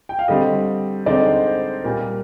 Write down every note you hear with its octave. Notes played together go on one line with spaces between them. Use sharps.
G5
F5
D3 G3 C4 D#5
D3 G#3 C4 D#4 D5
C5
C5
A#2 G3 A#3 A#4